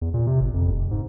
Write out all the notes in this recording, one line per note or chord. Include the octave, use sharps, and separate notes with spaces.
E2
A#2
C3
G1
F2
F1
G#2